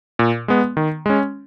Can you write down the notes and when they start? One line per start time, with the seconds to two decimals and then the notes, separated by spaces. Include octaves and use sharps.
0.19 A#2
0.48 G#3 B3
0.77 D#3
1.06 G#3 C#4